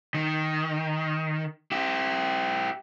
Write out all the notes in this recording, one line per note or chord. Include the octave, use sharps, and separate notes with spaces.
D#3
E4 G4